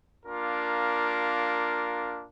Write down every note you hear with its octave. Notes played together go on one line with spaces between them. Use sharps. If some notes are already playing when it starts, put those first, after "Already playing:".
A#3 D4 F4 A#4